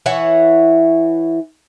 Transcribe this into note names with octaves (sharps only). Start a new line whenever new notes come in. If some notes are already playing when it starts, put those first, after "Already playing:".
E3 E4 C#5 F#5